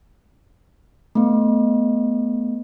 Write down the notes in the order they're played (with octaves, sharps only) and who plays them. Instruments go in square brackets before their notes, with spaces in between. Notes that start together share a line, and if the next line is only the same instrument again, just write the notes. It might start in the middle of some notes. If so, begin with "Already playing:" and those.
[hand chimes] A3 B3